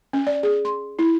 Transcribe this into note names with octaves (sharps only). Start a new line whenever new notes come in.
C#4
D5
G#4
C6
E4